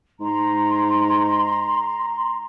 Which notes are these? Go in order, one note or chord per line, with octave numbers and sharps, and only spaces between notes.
G#2 A#5 C6